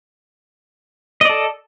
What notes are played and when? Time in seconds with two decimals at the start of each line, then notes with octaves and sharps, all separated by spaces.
1.21 D#5
1.25 D5
1.29 A4